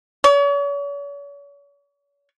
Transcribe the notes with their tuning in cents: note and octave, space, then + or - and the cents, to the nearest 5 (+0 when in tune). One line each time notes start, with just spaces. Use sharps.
C#5 +40